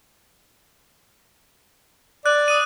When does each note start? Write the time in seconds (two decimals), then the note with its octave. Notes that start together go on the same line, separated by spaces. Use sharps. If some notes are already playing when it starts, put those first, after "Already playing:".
2.26 D5 F#6
2.48 D#6 D#7